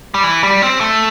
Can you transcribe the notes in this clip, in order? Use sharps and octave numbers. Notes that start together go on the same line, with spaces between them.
G3
E3
G3
C4
A3